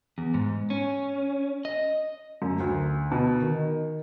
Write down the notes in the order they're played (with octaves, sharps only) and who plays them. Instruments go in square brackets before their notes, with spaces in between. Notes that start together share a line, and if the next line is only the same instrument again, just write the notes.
[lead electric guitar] E2
G#2
C#4
D#5
[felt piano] F#2
D2
B2
D#3